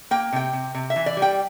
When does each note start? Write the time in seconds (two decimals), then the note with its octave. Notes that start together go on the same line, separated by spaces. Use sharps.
0.11 A#3 G5
0.33 C3 G5
0.53 C3
0.75 C3
0.90 E5
0.96 E3
1.06 D5
1.17 G3
1.22 G5